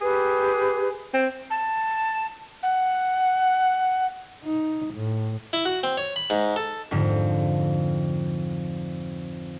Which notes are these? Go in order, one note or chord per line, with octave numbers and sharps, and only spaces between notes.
G4 G#4 B4
C4
A5
F#5
D#4
A2
E4
F#4
C4
C#5
B5
G#2
A4
F2 G#2 D3 F3